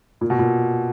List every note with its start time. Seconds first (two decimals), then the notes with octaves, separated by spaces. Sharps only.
0.21 A#2
0.30 B2
0.39 A#2